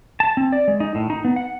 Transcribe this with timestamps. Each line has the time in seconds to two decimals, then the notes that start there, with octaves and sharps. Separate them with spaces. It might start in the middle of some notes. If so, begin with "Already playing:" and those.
0.20 A5
0.37 C4
0.52 D5
0.68 G#3
0.80 D#4
0.95 A2
1.10 D#4
1.25 B3
1.36 F#5